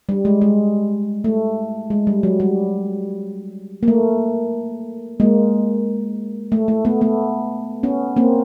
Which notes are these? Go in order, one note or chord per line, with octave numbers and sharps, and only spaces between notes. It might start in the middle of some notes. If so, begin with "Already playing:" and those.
G3
G#3
G#3
A3
G#3
G3
F#3
G3
A#3
A3
G#3 A#3
A3
A3
A3 B3
A3 B3
B3 C#4
A#3 C4